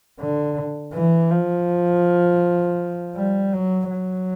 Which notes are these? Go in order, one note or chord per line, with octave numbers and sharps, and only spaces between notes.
D3
E3
F3
G3
F#3
F#3